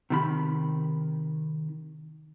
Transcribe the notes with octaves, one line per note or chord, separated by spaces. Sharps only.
C3 D#3 B5